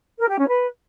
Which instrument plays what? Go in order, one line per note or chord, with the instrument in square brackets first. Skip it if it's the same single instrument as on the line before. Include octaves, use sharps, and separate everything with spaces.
[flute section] A#4
G4
C#4
B4